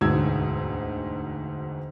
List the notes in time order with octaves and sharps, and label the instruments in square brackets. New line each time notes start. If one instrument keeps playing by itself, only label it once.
[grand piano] E1 D2 G#2 B2 E6 G#6